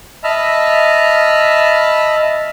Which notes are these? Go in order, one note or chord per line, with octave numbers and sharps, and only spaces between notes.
D#5 E5 A5 B5 F6